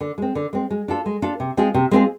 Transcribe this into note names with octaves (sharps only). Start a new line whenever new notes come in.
D3
G#3 C4
D3
G#3 C4
G#3
D4 F4 A4
G#3
D4 F4 A4
C3
G#3 C4 F4 G#4
C3
G#3 C4 F4 G#4